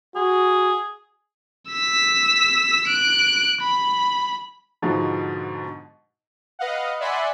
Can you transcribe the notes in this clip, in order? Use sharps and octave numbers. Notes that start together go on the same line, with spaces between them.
F#4 G#4
E6 B6
F#6 D7
B5
G#2 B2 D3 F3
B4 D#5 F5 F#5
D5 E5 F#5 G#5 B5 C6